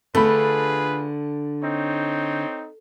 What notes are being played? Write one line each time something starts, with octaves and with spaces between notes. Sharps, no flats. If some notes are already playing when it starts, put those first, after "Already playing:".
D3 A3 F4 G#4 B4 B5
C4 D#4 C#5